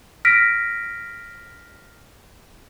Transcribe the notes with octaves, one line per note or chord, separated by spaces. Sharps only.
F6 A#6 B6 D7